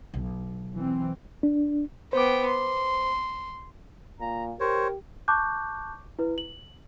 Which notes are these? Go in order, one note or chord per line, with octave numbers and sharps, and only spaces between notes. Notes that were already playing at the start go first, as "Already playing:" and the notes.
B1
E3 C4
D4
B3 C5 G5 D6
C6
A#2 A#5
G4 A#4 C5 C#5
A5 C#6 D6 F#6 G6
E4 B4
F#7